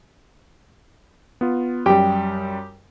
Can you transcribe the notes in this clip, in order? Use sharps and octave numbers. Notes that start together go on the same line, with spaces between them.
B3 F4
F#2 G3 G4 G5